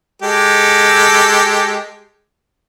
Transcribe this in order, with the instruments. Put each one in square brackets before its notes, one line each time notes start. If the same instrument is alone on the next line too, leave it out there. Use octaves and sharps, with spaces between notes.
[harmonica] G#3 G4 A4